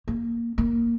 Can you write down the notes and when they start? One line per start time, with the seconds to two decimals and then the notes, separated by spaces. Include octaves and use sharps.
0.08 A#3
0.58 A#3